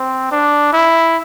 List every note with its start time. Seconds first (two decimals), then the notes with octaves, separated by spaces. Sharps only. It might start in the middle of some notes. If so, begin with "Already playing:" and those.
Already playing: C4
0.32 D4
0.73 E4